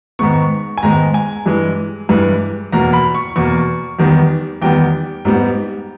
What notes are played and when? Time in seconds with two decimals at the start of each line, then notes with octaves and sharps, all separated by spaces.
0.19 G#2 D#3 G#3 B3 C#6
0.77 G#5
0.83 G#2 D#3 G#3 B3 A#5
1.14 G#5
1.46 G2 E3 G#3
2.09 G2 E3 G#3
2.72 E2 B2 A#3 A#5
2.93 B5
3.15 C#6
3.36 E2 B2 A#3 C#6
3.99 E2 D#3 G3 B3
4.62 E2 D#3 G3 B3 G5
5.25 G#2 G3 B3